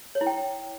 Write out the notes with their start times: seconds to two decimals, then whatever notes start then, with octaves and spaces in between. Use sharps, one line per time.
0.15 C#5
0.21 E4
0.27 G5